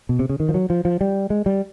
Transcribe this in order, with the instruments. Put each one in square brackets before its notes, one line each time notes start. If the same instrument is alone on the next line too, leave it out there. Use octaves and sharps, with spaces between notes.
[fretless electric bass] B2
C3
C#3
D#3
F3
F#3
F3
F3
G3
G#3
G3